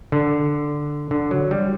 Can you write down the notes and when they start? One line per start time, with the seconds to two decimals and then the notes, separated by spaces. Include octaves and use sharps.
0.12 D3
1.11 D3
1.31 F#3
1.51 G3